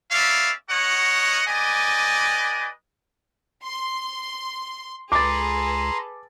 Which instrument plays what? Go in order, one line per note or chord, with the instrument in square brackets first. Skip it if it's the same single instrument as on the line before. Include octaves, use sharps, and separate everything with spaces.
[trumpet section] B3 C#4 D5 E5 F5
F#4 A#4 C#5 D#5 F#5
G4 B4 D5 D#5 G#5
[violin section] C6
[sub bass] C#2 [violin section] G#4 A4 B4 [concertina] A#5 C6 [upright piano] D6 A6